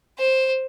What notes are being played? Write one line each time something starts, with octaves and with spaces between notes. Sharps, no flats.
C5